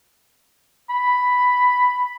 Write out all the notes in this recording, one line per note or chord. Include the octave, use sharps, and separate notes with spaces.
B5